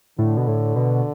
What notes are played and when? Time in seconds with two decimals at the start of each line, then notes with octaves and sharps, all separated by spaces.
0.18 A2 D3
0.37 B2
0.48 A2
0.76 B2